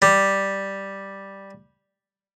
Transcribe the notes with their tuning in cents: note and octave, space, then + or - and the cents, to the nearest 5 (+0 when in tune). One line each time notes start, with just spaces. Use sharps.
G3 +0